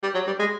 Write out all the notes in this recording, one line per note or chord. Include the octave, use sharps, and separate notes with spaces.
G3
F#3
G3
G#3